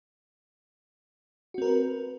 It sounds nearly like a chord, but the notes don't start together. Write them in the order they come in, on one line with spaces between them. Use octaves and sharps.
F#4 C4 A#4 B4